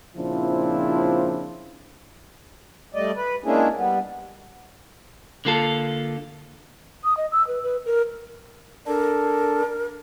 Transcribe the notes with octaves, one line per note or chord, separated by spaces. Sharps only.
A#2 C#3 F3 C4 D4 E4
G3 A3 D5 D#5
B4
G#3 A#3 C#4 D4 E4 G#4
G3 B3
D3 A#3 F4 A4
D#6
D#5
E6
B4
B4
A#4
D4 A4 A#4